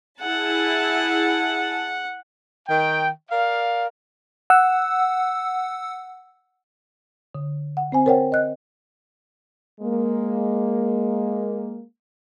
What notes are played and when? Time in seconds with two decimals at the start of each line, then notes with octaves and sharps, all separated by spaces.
0.21 E4 G#4 F#5 A5
2.68 D#3 G5
3.30 A#4 D5 F5
4.50 F#5 E6
7.35 D3
7.77 F#5
7.92 C4 C5 G#5
8.06 A#4 C5 C#5 F#5 G5
8.32 D#5 F#6
9.81 G#3 A#3